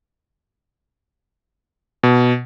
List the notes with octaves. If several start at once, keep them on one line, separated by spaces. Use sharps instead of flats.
B2